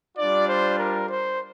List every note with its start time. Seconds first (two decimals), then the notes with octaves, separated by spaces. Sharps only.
0.17 G3 D4 F4 D5
0.48 C5
0.78 A#4
1.08 C5